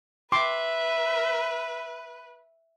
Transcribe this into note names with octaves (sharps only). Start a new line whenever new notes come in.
B4 E5 G5 C6 D6